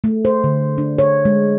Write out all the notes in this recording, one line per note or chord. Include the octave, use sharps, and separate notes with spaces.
A3
C5
D3
D4
C#5
G#3